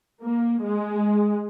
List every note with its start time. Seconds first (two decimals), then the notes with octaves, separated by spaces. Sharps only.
0.24 A#3
0.63 G#3